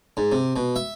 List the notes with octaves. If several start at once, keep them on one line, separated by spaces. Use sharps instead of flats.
G#2
C3
B2
E5